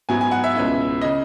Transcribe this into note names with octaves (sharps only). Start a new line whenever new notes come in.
G#2 F#3 B3 E4 G#5
G#5
F#5
E5
C#2 B2 G#3 C#4 E4
C#3 D#5